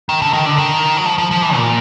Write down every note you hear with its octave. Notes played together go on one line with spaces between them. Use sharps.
D#3
D3
D#3
D3
D#3
F#3
F3
F3
F3
E3
A#2